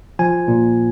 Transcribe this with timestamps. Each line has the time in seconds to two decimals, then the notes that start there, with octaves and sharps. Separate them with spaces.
0.19 F3 G#5
0.48 A#2